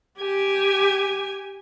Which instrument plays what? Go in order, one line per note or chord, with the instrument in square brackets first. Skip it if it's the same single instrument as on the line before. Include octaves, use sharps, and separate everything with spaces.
[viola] G4 G#5